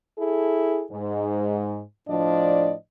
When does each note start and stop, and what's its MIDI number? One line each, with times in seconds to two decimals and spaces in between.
0.19 0.84 64
0.19 0.84 68
0.19 0.84 69
0.92 1.80 44
2.09 2.74 45
2.09 2.74 53
2.09 2.74 62
2.09 2.74 74
2.09 2.74 75